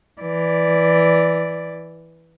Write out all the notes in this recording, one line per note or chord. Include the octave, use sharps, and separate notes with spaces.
E3 D5